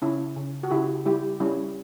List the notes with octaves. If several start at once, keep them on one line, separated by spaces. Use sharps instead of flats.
C#3 C#4 E4
C#3
F#4
C#3 E4 G4
G3 E4 G4
G3 C#4 E4